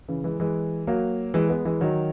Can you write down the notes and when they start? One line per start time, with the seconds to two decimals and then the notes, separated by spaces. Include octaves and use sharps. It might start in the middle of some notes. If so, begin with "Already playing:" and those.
0.08 C#3 E3
0.24 E3 G#3
0.40 E3 G#3
0.87 F#3 A#3
1.34 E3 G#3
1.49 G#3 B3
1.65 E3 G#3
1.81 D#3 F#3